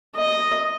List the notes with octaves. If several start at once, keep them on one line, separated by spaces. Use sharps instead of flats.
D#5